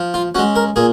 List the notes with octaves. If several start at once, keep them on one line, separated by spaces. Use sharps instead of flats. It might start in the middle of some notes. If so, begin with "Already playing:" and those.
Already playing: F3
F4
G#3 C#4 F#4
A#4
A#2 G#4